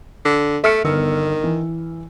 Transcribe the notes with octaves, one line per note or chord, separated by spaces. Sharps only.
D3
A3 E5 F6 C#7
G1 D#3 B3 E6
E3